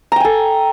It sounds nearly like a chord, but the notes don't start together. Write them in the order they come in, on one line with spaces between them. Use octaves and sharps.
A#5 G5 G#5 A4